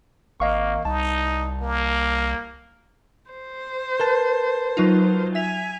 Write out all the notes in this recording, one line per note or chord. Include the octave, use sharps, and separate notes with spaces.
G#1 A#3 D#5 F5 C#6
C2 D#4 A5
A#3
C5
A#4 B4 A5
F#3 D#4 F4
E5 G#5 B6 F7